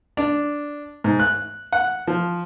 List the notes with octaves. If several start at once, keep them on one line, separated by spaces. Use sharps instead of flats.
D4
G#2
F#6
F#5
F3